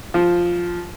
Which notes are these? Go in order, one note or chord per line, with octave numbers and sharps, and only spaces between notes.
F3